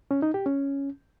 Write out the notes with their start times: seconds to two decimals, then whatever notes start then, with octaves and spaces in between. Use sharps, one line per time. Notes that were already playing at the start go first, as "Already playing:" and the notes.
0.11 C#4
0.22 D#4
0.34 G4
0.46 C#4